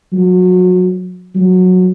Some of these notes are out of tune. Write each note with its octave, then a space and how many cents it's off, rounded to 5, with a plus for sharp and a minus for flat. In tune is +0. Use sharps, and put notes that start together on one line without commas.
F#3 -25
F#3 -15